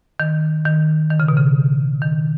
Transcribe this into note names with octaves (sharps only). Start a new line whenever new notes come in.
D#3
D#3
D#3
C#3
B2
C#3
D#3